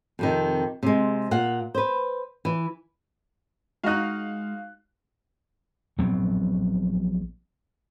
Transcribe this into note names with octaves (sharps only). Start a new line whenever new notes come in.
F2 C3 D#3
C3 G#3
A#2 F5 F#5
B4 C5
E3
G#3 D#4 F#4 F5 F#6
A#1 F#3 B3 C4